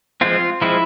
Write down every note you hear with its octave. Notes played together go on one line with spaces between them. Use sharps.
F3 G#3 C4 F4
F3 G#3 C4 E4